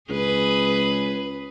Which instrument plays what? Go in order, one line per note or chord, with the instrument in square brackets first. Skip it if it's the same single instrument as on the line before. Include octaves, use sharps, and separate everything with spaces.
[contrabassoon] C#2 [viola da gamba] G#4 B4